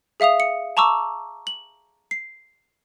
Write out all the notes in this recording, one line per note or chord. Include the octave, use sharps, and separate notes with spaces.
G#4 E5 F5 D#6 F7
C#7
A5 A#5 C#6 D6 E6
F#7
C7